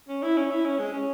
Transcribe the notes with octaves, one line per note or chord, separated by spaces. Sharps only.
C#4
E4
C#4
E4
C#4
G#3
C#4